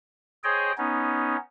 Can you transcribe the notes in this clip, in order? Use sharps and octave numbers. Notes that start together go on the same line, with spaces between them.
G#4 C5 C#5 D#5 G5
B3 C#4 D#4